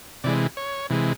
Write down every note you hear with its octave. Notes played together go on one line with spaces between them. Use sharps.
C3 E3 G#3 D5
C#5
C3 E3 G#3